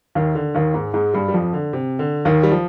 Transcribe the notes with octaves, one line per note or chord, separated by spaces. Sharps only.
D#2 D#3
D3
D#2 D#3
G#2 G#3
G#2 G#3
G2 G3
G3
F2 F3
D3
C3
D3
D#2 D#3
G3
F3